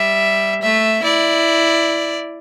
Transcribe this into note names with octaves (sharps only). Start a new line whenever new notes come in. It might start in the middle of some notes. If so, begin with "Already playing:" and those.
Already playing: G3 E5
A3 E5
E4 D5